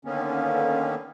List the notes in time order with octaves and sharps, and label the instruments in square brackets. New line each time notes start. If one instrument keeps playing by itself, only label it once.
[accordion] D3 D#3 A#3 B3 C#4